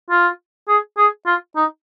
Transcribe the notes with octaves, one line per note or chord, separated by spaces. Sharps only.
F4
G#4
G#4
F4
D#4